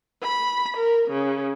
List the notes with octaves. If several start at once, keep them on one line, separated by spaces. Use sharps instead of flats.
B5
A#4
C#3